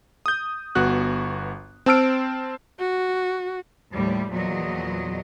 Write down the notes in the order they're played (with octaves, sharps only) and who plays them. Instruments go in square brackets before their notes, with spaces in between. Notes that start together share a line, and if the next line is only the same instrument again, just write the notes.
[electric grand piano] D#6 G6
G1 B3 F#4 F#6
C4 C5 A5 E6 F6 D7
[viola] F#4
[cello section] D#2 A2 F3 G3
E2 A#2 F3 F#3 D#5